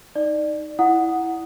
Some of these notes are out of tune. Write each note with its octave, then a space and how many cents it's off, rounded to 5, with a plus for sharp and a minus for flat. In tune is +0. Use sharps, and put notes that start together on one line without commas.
D#4 +0 D5 +20
E4 +0 F#5 +0 D#6 +0